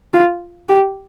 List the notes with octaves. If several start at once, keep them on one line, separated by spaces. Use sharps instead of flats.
F4
G4